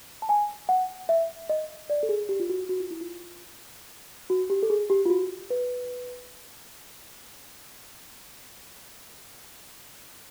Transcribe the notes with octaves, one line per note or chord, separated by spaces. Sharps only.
A5
G#5
F#5
E5
D#5
D5
A4
G#4
G4
F4
F#4
F#4
F4
E4
F4
F#4
G4
A4
G#4
G4
F4
F#4
B4